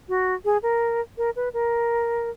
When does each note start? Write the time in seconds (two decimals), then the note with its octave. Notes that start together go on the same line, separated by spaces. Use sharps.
0.09 F#4
0.45 G#4
0.63 A#4
1.18 A#4
1.36 B4
1.53 A#4